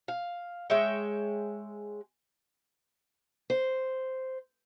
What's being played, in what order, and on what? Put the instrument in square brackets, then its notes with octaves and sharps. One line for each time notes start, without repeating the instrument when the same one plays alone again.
[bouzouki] F5
G#3 C#5 E5 G5
[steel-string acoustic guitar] C5